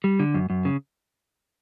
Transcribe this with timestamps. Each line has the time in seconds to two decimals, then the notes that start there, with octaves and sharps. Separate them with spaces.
0.04 G3
0.19 D3
0.34 F#2
0.50 F#2
0.65 C#3